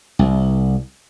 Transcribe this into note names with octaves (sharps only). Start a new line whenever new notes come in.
C2